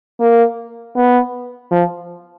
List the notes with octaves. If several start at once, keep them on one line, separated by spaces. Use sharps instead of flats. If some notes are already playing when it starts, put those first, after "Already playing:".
A#3
B3
F3